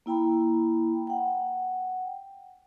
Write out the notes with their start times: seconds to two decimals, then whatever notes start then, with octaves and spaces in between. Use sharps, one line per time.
0.06 A#3 E4 G5 A#5 B5
1.07 F#5 G5